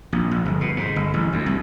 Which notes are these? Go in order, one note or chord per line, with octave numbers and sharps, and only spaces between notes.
A#1
A#1
G1
B2
G#2
G1
A1
D2
C2